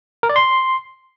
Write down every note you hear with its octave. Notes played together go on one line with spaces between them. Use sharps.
A#4
D5
C6